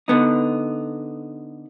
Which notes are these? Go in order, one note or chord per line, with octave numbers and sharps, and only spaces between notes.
D3 B3 D#4